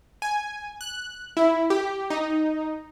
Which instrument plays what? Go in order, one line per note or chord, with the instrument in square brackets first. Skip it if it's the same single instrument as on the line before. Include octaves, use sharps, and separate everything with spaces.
[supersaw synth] G#5
F#6
E4
G4
D#4